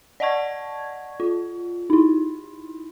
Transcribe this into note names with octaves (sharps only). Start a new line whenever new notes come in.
D5 D#5 F#5 A5 C#6 G#6
F4
D#4 E4